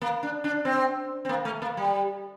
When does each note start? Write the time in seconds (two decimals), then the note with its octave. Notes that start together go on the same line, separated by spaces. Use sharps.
0.02 A#3
0.23 D4
0.44 D4
0.65 C4
1.25 C4
1.29 A#3
1.45 A3
1.62 A#3
1.77 G3